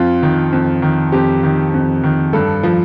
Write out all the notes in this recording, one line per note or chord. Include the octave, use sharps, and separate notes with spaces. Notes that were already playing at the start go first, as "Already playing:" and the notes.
Already playing: F2 F4
D#3
F2
D#3
F2 G4
D#3
F2
D#3
G2 A4
F3